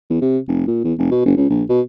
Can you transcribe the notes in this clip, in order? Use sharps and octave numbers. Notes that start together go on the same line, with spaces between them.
E2
C3
F1
A#2
E2
F1
B2
F#1
C#2
A#1
B2